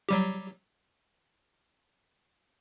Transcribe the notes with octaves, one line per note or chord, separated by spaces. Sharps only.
F#3 G3 G4